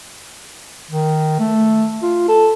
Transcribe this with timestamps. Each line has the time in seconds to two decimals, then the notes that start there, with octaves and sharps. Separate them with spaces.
0.91 D#3
1.39 A3
2.02 F4
2.28 A4